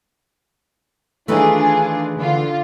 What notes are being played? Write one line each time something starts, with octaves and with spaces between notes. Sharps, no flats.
D#3 E3 A3 D4 F4 G#4
D3 F4